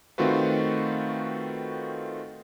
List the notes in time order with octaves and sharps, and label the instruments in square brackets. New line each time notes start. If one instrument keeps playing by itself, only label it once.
[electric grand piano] D#3 A3 C4 F4 F#4 B4